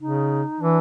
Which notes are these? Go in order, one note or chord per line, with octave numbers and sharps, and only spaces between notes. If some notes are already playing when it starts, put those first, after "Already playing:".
C#3 D#4
E3 D4